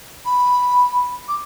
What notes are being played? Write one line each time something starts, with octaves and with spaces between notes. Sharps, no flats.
B5
D6